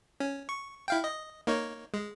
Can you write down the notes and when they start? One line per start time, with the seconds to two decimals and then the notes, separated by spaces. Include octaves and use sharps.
0.20 C#4
0.49 C#6
0.88 E4 F5 G5
1.04 D#5
1.47 A#3 D#4 C#5
1.94 G#3